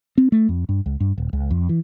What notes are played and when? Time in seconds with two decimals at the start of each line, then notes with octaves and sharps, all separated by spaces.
0.18 C4
0.32 A3
0.49 F2
0.69 G2
0.86 C#2
1.00 G2
1.18 D#1
1.33 C#2
1.51 F2
1.69 E3